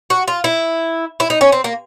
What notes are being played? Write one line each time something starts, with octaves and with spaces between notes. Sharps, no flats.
F#4
F4
E4
E4
D#4
C#4
C4
A#3